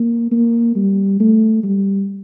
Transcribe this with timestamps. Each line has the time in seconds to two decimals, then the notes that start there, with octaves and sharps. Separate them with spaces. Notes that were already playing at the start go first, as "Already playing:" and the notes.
Already playing: A#3
0.32 A#3
0.76 G3
1.20 A3
1.64 G3